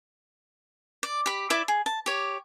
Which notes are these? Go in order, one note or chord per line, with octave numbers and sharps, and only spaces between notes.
D5
G4 B5
E4 D5 E5 D6
G#4
A5
G4 C#5